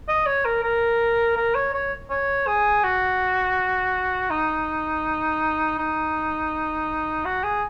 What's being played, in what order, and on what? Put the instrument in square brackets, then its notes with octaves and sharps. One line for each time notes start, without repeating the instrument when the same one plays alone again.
[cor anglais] D#5
C#5
A#4
A#4
A#4
C#5
C#5
C#5
G#4
F#4
D#4
D#4
F#4
G#4